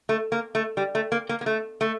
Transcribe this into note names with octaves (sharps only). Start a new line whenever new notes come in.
A3
A#3
A3
G3
A3
A#3
A#3
A#3
A3
A3